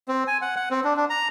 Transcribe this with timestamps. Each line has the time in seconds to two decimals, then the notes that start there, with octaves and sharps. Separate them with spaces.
0.08 C4
0.27 G#5
0.41 F#5
0.56 F#5
0.71 C4
0.84 D4
0.96 D4
1.10 A#5